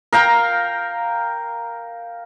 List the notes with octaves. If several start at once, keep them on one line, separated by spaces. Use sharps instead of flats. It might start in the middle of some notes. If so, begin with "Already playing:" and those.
A#4 F5 G5 A#5